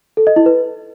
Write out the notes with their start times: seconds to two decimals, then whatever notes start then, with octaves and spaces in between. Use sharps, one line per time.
0.17 A4
0.27 D#5
0.36 E4
0.46 B4